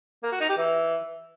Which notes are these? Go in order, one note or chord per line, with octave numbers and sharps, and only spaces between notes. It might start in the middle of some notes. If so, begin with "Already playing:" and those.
A#3
F#4
D#4
G4
E3